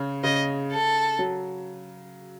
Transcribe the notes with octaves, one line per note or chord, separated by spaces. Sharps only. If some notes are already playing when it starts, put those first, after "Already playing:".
Already playing: C#3
C#3 D#5
A4
F#3